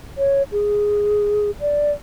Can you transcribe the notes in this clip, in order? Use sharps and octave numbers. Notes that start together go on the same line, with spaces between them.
C#5
G#4
D5